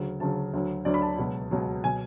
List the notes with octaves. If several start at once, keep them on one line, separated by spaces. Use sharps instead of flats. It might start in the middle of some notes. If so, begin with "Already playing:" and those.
Already playing: D2 C#3 F#3
D2 C#3 F#3 A5
D2 D3 F#3
D2 D3 F#3 D5
B5
A5
C#2 B2 F#3
C#2 B2 F#3
B2 F#3 G#5